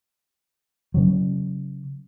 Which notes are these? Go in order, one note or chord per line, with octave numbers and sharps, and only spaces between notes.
C#3 F#3